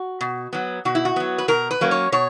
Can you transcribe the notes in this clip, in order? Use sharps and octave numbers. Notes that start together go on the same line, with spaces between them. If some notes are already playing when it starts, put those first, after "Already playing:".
Already playing: F#4
B2
F#3 B3
B2 F#4
E4
F#4
F#3 B3
B4
B2 A#4
B4
F#3 A#3 C#4
C#5
B2 C#5